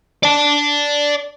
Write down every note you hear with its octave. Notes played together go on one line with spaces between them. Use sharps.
D5 A5